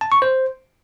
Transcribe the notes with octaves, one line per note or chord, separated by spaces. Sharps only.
A5
C#6
C5